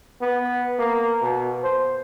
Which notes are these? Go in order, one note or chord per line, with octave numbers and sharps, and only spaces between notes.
B3
A#3
B2
C5